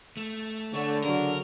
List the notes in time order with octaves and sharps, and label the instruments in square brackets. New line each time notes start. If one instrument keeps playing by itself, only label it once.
[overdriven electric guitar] A3
[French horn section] D3 [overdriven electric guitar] A3 [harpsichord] C#4
[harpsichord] C#3 F#3 [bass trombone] D4 [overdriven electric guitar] A#4